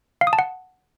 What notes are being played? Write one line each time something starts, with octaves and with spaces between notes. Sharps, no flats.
F5
D#6
A5
F#5